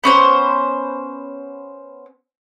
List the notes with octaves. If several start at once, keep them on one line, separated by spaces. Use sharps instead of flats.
B3 C#4 C5